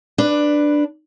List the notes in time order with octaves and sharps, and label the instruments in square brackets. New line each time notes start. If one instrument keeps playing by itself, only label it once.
[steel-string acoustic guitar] D4 B4